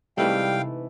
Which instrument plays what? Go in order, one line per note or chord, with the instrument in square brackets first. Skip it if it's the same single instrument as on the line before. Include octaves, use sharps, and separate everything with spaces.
[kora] G#2 E3 A3 [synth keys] C3 B4 [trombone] G3 [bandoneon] F5 G5